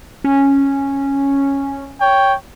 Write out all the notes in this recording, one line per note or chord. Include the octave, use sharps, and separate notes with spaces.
C#4
C#5 G5